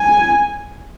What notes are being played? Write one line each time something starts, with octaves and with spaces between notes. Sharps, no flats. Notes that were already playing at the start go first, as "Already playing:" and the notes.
Already playing: G#5